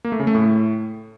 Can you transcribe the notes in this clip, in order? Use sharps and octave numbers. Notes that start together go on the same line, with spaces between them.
A#3
A3
C#3
A3
A2